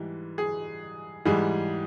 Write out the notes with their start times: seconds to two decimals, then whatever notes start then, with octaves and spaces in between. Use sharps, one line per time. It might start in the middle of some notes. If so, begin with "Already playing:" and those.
Already playing: G#2 E3 G3
0.38 G#4
1.25 G#2 E3 G3 G#4